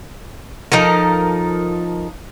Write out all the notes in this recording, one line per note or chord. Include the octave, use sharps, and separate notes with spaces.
F3 D#4 A4 A#4